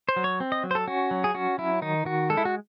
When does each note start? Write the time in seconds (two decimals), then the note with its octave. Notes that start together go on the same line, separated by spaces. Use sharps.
0.09 C5
0.16 F#3
0.24 C#5
0.40 C4
0.52 D#5
0.63 F#3
0.71 C5
0.75 A4
0.87 C#4 F#4
1.11 F#3
1.24 G#4
1.35 C#4 F#4
1.58 F#3 E4
1.82 D#3 D#4
2.05 D#3 F#4
2.30 G#3 A4
2.37 E4
2.45 F#4